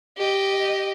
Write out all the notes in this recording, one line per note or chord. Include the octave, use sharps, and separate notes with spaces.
G4 D#5